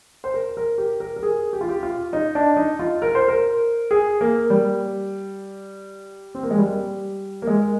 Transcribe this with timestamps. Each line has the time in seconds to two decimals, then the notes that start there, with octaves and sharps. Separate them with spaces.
0.24 C5
0.34 A#4
0.57 A#4
0.78 G4
1.00 A#4
1.16 A#4
1.23 G#4
1.53 G4
1.61 F4
1.69 G4
1.83 F4
2.13 D#4
2.35 D4
2.57 D#4
2.79 F4
3.02 A#4
3.15 C5
3.28 A#4
3.91 G#4
4.21 A#3
4.50 G3
6.35 C4
6.43 A#3
6.51 G#3
6.58 G3
7.42 A#3
7.47 G#3